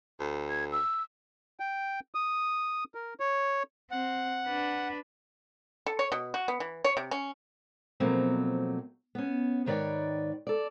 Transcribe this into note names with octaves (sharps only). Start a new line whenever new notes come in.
D2
G#6
E6
G5
D#6
A#4
C#5
C4 F#5
D4 B4
A4
C#5
B2
F#4
B3
E3
C#5
C3
C#4
B2 F3 F#3 A3 A#3 C4
B3 C#4
G#2 D#3 B4 C#5 D5 G5
A4 D5